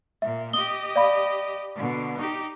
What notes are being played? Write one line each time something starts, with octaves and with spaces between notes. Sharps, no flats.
A#2 A#3 E5
G4 D#5 D#6 G7
D5 F5 B5
B2 D3
D#4 G4